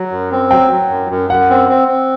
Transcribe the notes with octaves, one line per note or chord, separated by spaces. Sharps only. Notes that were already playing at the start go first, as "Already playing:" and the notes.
Already playing: F#3
F#2
C4
F#3 G5
F#3
F#2
F#2
F#2 F#5
C4
C4
C4